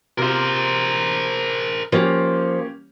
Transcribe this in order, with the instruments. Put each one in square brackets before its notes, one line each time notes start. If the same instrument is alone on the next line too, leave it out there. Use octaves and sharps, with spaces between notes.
[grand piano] C3 F4 [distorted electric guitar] A#4 C5
[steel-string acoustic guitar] F3 [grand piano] A#3 C#4 G4